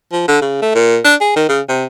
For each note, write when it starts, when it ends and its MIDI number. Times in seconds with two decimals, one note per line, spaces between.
0.12 0.23 53
0.28 0.40 50
0.41 0.59 49
0.62 0.73 57
0.75 0.98 46
1.05 1.15 62
1.21 1.35 68
1.36 1.47 51
1.49 1.61 49
1.69 1.85 48